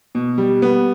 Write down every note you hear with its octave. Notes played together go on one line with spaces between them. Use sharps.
B2
G3
B3